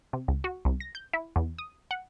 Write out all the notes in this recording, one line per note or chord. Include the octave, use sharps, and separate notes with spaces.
C3
C#2
F#4
C2
A#6
G6
E4
E2
D#6
F#5